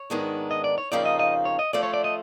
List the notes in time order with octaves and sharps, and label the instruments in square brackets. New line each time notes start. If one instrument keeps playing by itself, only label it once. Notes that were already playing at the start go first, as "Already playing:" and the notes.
Already playing: [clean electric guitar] C#5
[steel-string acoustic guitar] G#2 D#3 G#3 B3 D4
[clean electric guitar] D#5
D5
C#5
[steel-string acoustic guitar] F2 C#3 F3 A#3 D#4 [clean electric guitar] D5
[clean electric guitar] D#5
D#5
C#5
D#5
[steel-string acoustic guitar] F3 A3 C#4 [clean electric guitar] D5
[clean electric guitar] C#5
D5
D#5